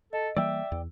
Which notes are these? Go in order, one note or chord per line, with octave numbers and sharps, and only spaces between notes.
A4 D#5
E3 G3 A#3 D5 E5 G5 E6
E2